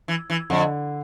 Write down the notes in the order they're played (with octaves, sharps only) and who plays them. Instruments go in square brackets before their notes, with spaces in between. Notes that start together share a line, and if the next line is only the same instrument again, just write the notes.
[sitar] E3
E3
[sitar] F2 [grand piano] D3